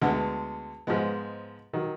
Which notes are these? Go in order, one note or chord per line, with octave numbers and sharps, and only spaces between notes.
D2 D3 G#3 B3
G#2 F3 G#3 B3
D#3 F#3